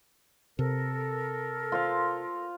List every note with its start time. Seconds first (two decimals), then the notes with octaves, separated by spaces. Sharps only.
0.59 C3 A4 A#4
1.72 F4 C5 F5